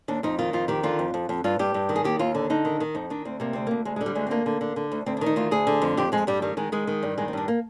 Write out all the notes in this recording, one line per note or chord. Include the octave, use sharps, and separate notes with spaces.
D#2 D4
F2 D#4
D#3 F4
F2 F4
D#3 G4
D3 F4
F2
F2
F2
G2 F4
G2 G4
G2
D#3
G#4
D#2 G4
D#2 F4
D3
D3 D#4
D#3
D#3
F2 D#4
D#3 D4
D2 C4
C3 A#3
D2 C4
D2 A#3
D2 G#3
G#3
D3
G3
D2 G#3
C4
D3 A#3
D3
D3
D3
D2
D2 C4
D4
D#3
D#4
D2 F4
D2 G#4
D3
F2
F2 G4
F2 G#3
G2 G3
D#3 G3
D#3 G#3
D#3 G#3
D#3
G2
D#3 G#3
C4
G2 D4
A#3